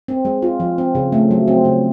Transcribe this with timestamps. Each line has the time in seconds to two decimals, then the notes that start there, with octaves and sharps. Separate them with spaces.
0.08 C4
0.25 G#3
0.42 F4
0.60 F3
0.78 C4
0.95 C#3
1.12 A3
1.31 F#3
1.48 C4
1.65 C#3